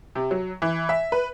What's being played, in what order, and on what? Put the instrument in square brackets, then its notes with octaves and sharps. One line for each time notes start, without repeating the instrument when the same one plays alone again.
[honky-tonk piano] C3
F#3
E3
E5
B4